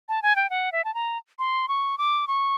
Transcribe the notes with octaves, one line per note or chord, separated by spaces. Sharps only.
A5
G#5
G5
F#5
E5
A5
A#5
C6
C#6
D6
C#6